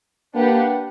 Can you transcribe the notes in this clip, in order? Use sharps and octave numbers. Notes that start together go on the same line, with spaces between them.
A#3 D4 G4 B4 F#5